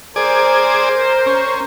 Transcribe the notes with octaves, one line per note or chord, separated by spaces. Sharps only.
G#4 A#4 C5 D5
C#4